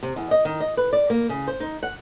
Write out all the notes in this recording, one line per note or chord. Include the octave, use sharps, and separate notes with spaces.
C3
E2
D#5
D#3
D#5
B4
D5
A#3
C#3
C5
D#4
F#5